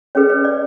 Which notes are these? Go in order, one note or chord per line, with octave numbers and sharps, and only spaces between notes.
C#4 G#4 B4 C#5
C#5
D5